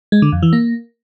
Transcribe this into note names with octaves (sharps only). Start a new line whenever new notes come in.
G#3
D3
F2
E3
A#3